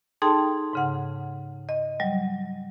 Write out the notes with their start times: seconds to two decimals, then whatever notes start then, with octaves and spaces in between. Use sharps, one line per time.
0.22 D#4 G#4 A4 G5 A5 C6
0.73 G#2 C#3 F#5
1.69 D#5
2.00 F#3 G3